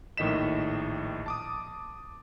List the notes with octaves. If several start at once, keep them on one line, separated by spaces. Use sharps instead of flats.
A#1 A2 D#3 D#5 B6 E7
A5 D6 D#6